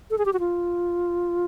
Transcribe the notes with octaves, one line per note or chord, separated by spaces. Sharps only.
A4
G#4
G4
F#4
F4